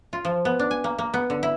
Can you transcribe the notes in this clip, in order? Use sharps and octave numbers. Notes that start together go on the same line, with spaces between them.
F4
F3
B3
D4
G#5
A#3
A#3
B3
D3
E4